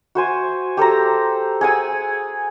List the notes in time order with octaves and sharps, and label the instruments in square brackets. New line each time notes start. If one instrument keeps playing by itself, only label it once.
[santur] F#4 C5 G#5
G4 A4 C5 A#5
G#4 F#5 G#5 E6